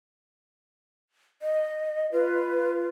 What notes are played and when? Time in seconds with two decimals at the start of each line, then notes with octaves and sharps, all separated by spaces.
1.42 D#5
2.12 F4 B4